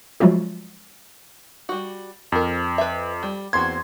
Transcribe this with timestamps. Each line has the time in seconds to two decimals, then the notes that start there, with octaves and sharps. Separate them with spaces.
0.20 F3 F#3 G#3 A3 F4 F#4
1.69 G3 F#4
2.32 F2 A#4 C5
2.78 B4 E5
3.23 G3
3.53 E2 A#3 C4 F#4 C6 G#6